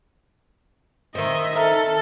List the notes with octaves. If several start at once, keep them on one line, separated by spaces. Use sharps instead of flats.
D#3 C4 D#5 E5
A4 E5 A#5 F6